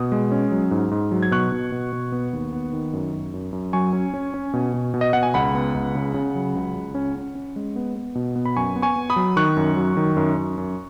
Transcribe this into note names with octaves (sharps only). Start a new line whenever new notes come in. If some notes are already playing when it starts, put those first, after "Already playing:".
Already playing: B2 D#6
G#3
C#4
F#3
G#2
G#2
F#3
G#6
B2 C#6 F#6
B2
B2
B2
B3
D#2
B3
D#3
F#2
F#2
F#2
F#2
F#3 G#5 C#6
C#4
C#4
C#4
B2
B2
B2
D#5
B2 F#5
G#5
C#2 F#5 B5
B3
C#2
C#3
C#3
F#3
C#2
C#2
C#4
C#4
C#4
G#3
B3
B3
B2
B3
B5
F#2 G#5 C#6
B3
G#5 C#6
B3
B5 D#6
F#3
D#3 C#6 F#6
F#2
F#3
D#3
F#2
F#2
F#2